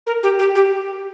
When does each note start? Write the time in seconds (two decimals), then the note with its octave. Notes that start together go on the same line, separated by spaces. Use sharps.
0.06 A#4
0.23 G4
0.38 G4
0.55 G4